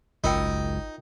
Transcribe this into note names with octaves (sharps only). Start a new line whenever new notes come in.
G#1 C#2 F#2 D#4 F4 A#4 G5